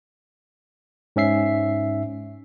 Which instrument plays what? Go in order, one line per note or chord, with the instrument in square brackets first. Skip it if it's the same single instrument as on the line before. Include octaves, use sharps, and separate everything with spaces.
[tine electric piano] G#2 C#4 E5 C7